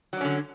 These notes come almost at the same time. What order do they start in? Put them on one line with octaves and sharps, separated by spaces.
F#3 D4 C#4 D3